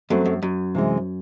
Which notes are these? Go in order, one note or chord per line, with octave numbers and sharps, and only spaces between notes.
F#2 F#3 A3 C4
F#2
F#2
C3 E3 G#3